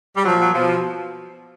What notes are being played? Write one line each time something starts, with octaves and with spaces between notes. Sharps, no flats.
G3
A#2 F3 F#3
F#3
B2 F3